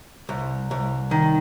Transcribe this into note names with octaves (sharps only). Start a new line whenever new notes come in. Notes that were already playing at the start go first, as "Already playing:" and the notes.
C2
C2
D#3